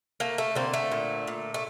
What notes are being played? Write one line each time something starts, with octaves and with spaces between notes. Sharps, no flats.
A3 A#3
A3
D3 A#3 C4
A3
A#2
A#2
A3